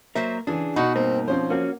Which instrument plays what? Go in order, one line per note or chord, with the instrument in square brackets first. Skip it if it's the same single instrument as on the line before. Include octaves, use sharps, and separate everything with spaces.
[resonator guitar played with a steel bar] F#3 C5 E5 [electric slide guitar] A#3 A#4
[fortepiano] C#3 E3 [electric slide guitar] D4 [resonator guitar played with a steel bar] G#4
[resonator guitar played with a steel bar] B2 D#4 [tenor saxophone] F#4 [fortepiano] B5
[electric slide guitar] G2 A#3 A#4 [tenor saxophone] C4
[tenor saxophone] F3 [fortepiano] C4 C#4 C5
[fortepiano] A#3 [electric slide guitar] C#4 F#4